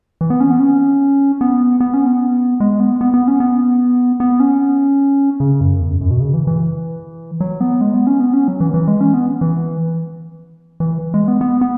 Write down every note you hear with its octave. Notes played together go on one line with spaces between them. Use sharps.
E3
B3
C#4
B3
C#4
B3
B3
C#4
B3
G#3
B3
B3
B3
C#4
B3
B3
C#4
C#3
F#2
E2
F#2
F#2
B2
C#3
E3
E3
F#3
B3
G#3
B3
C#4
B3
C#4
F#3
E3
E3
G#3
C#4
B3
E3
E3
G#3
B3
B3
B3